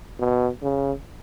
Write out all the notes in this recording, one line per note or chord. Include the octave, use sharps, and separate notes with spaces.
B2
C#3